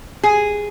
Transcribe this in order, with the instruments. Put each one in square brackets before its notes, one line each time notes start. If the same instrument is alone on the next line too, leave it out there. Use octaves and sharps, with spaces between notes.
[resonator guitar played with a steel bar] G#4